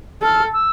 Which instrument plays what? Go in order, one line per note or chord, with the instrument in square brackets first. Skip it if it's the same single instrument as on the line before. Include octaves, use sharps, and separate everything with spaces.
[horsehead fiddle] A4 [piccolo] F6
[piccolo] E6